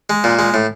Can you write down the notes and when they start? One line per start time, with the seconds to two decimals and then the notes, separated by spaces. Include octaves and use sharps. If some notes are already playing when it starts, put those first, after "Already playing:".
0.10 G#3
0.24 A#2
0.39 G#3
0.54 A2